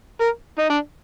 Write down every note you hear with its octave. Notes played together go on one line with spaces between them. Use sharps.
A#4
D#4
D4